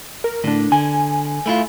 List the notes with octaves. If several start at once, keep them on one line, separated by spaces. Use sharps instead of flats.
A#4
A2 D3 D4
D3 G#5
A3 E4 F4